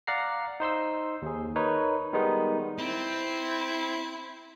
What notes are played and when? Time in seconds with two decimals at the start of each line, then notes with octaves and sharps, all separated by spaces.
0.07 D5 F5 F#5 A#5 C7
0.60 D#4 C5 C6 E6
1.22 D#2 G#4
1.56 D#4 A#4 B4 C#5
2.13 D#3 G3 G#3 B3 D#4
2.79 C4 E4